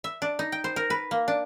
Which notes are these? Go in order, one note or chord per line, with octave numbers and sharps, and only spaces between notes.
E5
D4
D#4
G5
C5
A#4
B4
A#3
D4